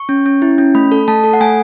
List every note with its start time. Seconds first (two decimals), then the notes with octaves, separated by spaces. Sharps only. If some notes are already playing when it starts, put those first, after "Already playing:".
Already playing: C#6
0.09 C#4
0.26 C#4
0.42 E4
0.58 C#4
0.75 A3 B5
0.92 A4
1.08 A3 A5
1.24 A4
1.33 F#5
1.40 A3 G#5